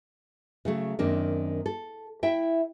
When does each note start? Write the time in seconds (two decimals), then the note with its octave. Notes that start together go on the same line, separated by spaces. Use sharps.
0.65 C#3 F#3 A3
0.99 F#2 D#3 A#3 C4 D4
1.66 A4
2.23 E4 E5 G5